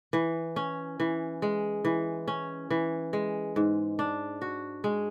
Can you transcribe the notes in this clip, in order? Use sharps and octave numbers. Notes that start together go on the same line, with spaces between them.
E3
C#4
E3
G#3
E3
C#4
E3
G#3
G#2
D4
F#4
G#3